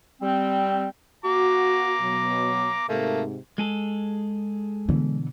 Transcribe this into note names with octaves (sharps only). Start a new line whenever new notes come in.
G3 C4
F#4 A#5 D6
B2 F#3
G#2 C3 A3 A#3
G#3 G#4 A4
B2 D3 E3 B3